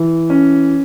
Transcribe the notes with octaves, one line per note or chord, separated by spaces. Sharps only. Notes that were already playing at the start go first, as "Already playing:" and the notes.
Already playing: E3
C#4